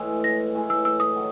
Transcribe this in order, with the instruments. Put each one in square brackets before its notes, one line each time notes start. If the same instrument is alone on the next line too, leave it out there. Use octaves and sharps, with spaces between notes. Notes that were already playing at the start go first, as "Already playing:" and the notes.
Already playing: [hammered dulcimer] A2 E3 G#3
[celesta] A#6
[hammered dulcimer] A2 E3 G#3
[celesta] E6
E6
D#6
[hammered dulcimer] D#3 F#3